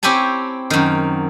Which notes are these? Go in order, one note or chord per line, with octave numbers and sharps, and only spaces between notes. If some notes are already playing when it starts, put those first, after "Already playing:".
C4 E4 G4 C#5 G#5 A5
F#2 D#3